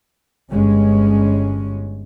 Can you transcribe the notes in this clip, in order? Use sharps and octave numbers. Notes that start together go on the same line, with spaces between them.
G1 G2 G#3 C#4